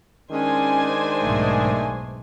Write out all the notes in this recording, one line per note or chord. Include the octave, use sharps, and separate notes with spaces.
D#3 G#3 C#4 D4 C5 G#5
B1 G#2 A3